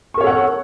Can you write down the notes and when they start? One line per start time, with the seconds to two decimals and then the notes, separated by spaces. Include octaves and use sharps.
0.14 C#6
0.17 A#4
0.21 C#5
0.24 A4
0.27 F#5